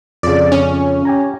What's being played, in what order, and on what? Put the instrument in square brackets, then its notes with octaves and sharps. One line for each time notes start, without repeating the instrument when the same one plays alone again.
[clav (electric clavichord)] F2 C#3 [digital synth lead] D5
[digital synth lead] C#4
[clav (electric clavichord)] G4 G#5 A#5